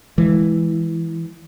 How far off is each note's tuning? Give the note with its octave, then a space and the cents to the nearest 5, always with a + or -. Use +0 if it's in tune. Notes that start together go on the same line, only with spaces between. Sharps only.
E3 +0 G#3 +0